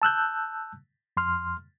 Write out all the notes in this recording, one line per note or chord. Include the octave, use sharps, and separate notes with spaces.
A5 E6 F#6 G6
F2 C6 F6